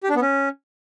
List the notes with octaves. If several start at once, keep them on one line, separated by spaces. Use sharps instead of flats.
G4
D4
B3
C#4